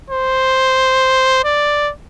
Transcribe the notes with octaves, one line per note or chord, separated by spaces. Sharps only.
C5
D5